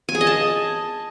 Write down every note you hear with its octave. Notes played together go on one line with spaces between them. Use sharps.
G#5
G#4
D#5
A5